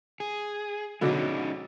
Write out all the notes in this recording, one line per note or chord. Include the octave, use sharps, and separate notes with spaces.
G#4
B2 D3 F#3 G#3 C#4 D#4